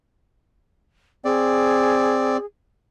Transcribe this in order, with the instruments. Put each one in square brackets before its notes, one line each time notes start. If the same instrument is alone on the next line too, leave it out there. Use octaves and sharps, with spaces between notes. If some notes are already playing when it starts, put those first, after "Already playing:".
[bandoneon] C4 D5 [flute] G#4